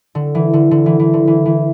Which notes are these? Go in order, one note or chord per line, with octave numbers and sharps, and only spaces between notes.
D3
E3
D3
D3
E3
E3
D3
E3
E3